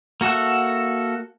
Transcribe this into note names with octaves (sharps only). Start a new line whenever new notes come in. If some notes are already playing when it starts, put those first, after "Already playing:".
A#3 F#4 A4 E5 F#5